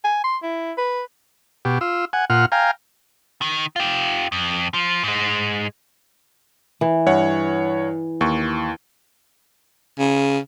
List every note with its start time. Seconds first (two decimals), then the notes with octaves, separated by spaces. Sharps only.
0.05 G#5
0.24 C6
0.43 E4
0.78 B4
1.65 B2 G4
1.81 F4 E6
2.13 F#5 G#5
2.30 A#2 F4 F#5 F6
2.52 F5 G5 G#5 A#5
3.42 D#3
3.76 F4 G4
4.32 F2
4.74 F3
5.03 G#2 G#3
6.81 E3
7.06 G2 C#5 F#5
8.21 D#2 C#6
9.99 C#3